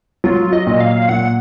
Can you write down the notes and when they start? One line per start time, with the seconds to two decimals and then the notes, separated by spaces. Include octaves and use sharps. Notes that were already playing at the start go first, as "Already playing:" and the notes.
0.24 F#3 F4
0.53 D#5
0.67 A#2
0.81 F5
1.09 A#2 F#5